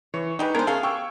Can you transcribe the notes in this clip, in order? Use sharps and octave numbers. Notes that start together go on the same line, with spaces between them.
E3 C#5
D#3 G3 G#3 D#4 B4
G#3 B3 D4 A#4 C5 G#6
A3 C#4 G#4 A4 F5
G4 G5 C#6 E6